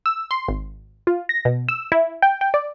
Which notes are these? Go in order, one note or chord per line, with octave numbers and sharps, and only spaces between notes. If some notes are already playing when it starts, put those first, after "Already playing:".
E6
C6
G#1
F4
A#6
B2
E6
E4
G5
G5
D5